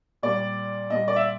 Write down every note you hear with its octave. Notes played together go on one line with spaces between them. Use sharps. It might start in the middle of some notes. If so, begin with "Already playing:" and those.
A#2 G3 D5
A#2 G3 D#5
D5
E5